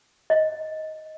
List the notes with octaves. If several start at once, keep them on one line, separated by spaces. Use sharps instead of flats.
D#5